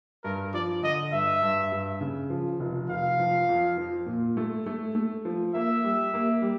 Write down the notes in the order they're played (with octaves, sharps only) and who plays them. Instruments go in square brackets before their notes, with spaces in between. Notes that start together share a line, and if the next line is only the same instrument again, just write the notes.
[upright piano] G2 [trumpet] A#4
[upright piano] F3 [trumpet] D5
[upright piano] D3 [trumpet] D#5
[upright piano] G2 [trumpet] E5
[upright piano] G2
G2
C#3
F3
F1
[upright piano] F1 [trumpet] F5
[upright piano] F3
F2
F3
A#2
A3
A3
A3
F3
[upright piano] A#3 [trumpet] E5
[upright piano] G3
A#3
G3